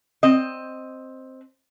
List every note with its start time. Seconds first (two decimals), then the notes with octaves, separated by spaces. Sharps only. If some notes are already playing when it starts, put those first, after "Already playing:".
0.23 C4 D#5